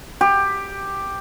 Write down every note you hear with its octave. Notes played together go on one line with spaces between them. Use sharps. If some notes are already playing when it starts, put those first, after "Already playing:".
G4